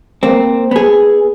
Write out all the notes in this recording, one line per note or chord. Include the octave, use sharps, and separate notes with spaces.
A#3 C4
B3 G#4